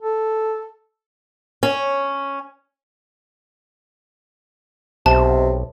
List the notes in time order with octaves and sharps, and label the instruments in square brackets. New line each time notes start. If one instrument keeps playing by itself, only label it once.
[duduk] A4
[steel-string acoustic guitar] C#4
[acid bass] B1 [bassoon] C3 [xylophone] A5